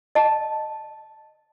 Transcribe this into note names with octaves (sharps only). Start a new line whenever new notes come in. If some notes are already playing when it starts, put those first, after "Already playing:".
D#5 A5